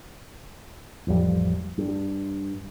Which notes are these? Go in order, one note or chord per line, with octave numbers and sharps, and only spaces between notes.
A1 F2 F3 G3
G2